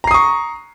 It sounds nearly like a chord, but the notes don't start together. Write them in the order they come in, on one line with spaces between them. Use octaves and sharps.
A#5 C7 D#6 C#6